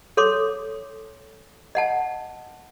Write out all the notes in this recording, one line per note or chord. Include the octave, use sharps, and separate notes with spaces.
A4 C#5 C6 D6
D#5 F#5 A5